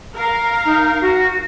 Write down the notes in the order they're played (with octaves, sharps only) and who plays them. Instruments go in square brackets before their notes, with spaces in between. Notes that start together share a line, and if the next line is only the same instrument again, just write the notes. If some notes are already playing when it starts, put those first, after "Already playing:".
[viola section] A#4 F5
[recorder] D#4
F#4